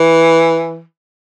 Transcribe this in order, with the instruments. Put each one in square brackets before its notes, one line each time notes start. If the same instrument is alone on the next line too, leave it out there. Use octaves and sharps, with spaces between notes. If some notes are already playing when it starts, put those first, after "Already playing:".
Already playing: [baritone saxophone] E3